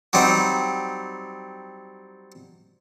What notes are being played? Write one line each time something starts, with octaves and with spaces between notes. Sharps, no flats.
F#3 G3 C4 D#4